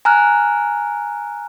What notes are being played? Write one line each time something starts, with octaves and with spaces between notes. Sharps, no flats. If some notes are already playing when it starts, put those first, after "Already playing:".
G#5 A#5 F6 F#6